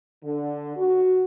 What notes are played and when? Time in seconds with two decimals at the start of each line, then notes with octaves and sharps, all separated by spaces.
0.23 D3
0.76 F#4